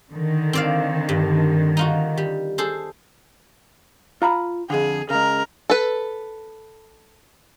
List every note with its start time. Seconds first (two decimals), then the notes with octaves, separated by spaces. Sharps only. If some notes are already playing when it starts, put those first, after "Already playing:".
0.11 D3 D#3
0.53 C4 D5 F5
1.09 G2
1.77 D#4 F4 F#4
2.17 G3
2.58 G#4 A4 C5
4.22 F4 A#5 B5
4.70 F2 D3 G#4
5.10 C#3 G#3 A#4
5.70 A4 B4